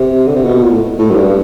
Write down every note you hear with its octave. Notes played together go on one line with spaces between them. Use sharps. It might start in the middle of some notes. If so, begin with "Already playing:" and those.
Already playing: C3
D3
C3
B2
A#2
A2
A2
F#2
G2